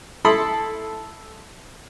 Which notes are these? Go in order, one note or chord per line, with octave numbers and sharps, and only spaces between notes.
E4 A4 A5 B5 C6 D#6